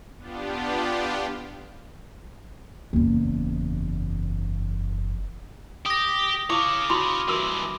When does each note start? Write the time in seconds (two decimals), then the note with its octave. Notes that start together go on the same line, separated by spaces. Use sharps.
0.18 B3 D4 F4 G4
2.93 F#1 E2
5.86 G4 D#6 A#6
6.50 E4 C#5 F5 C#6 D6
6.90 E4 F#4 G4 B5 C6
7.28 G2 E3 F#4 A#4 E6